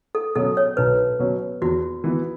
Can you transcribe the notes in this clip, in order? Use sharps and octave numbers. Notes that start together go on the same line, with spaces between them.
A4
B2 F#3 C#4 A4
C#5
B1 B4
B2 F#3 C#4
E2 F#4
E3 B3 E4